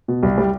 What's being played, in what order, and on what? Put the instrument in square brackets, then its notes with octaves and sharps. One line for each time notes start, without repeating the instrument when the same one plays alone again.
[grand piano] B2
C2
G3